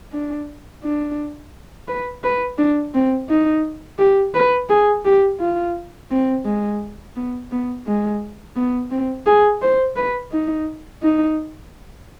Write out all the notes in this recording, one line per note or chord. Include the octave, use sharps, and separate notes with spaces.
D4
D4
B4
B4
D4
C4
D#4
G4
B4
G#4
G4
F4
C4
G#3
B3
B3
G#3
B3
C4
G#4
C5
B4
D#4
D#4